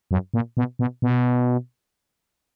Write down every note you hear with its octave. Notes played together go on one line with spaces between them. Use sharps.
F#2
A#2
B2
B2
B2